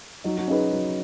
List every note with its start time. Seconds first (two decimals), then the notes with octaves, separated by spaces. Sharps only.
0.24 F#3 D#4
0.38 F#4
0.48 C#4 D#4 G#4 B4
0.73 F#3